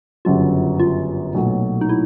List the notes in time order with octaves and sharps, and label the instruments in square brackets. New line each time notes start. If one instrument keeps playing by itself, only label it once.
[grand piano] G1 F#2 C#3 F#3 [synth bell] F4
[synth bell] F4
[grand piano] B1 A#2 F#3 A3
[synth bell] D#4
E4